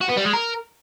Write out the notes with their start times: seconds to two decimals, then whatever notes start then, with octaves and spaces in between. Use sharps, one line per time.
0.01 F#4
0.09 B3
0.17 G3
0.25 G#3
0.34 A#4